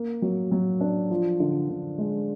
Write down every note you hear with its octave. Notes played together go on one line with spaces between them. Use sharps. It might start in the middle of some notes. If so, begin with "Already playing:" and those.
Already playing: A#3
F#3
F#3
D4
F3
D3
D3
G#3